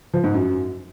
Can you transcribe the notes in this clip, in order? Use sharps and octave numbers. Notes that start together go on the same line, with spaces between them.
F3
G#2
F#2